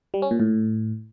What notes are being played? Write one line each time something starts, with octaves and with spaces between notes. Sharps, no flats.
G3
C#4
A#2
A2